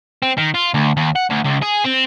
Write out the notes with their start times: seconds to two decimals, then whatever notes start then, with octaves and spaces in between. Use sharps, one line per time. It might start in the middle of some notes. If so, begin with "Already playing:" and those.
0.23 C4
0.38 D#3
0.54 F4
0.74 D2
0.97 D#2
1.16 F#5
1.30 D2
1.45 C#2
1.63 G#4
1.85 C4